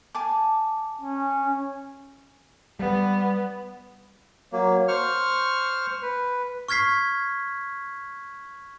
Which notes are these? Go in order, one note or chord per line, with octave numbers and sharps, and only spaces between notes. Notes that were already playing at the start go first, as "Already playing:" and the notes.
G#5 A5 D6
C#4
G3 B3
F#3 A#3
C5 C#6 F6
B4
C#6 F6 G#6 B6 C7